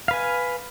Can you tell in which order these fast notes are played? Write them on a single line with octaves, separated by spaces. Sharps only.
F5 B4 G#5